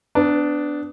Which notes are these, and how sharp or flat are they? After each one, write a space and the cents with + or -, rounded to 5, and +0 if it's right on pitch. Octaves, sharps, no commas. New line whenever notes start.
B3 +25 D4 +0